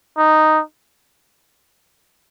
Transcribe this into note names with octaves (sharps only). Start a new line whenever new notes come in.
D#4